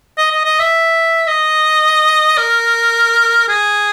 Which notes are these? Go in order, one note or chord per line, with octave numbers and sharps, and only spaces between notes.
D#5
D#5
D#5
E5
D#5
A#4
G#4